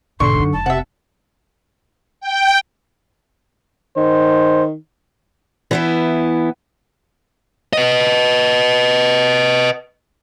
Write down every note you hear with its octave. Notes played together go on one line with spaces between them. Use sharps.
G#2 B2 D3 C6 C#6
F#2 D#4
F1 A5
C3 E5 F#5
G5
D#3 C5
E3 B3 E4
B4 D#5